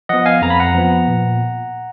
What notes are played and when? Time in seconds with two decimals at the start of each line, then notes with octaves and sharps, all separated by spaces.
0.09 F3 B3 D#5 F#5
0.26 F5 G#5
0.42 F2 A#5
0.50 B5
0.60 F#5 A#5
0.74 F3 B3
1.08 A#2